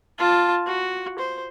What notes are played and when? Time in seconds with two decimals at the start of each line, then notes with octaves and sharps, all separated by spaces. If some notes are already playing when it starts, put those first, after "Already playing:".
0.19 F4 A5
0.67 F#4
1.19 C5